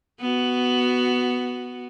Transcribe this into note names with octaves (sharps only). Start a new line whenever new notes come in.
B3 F#4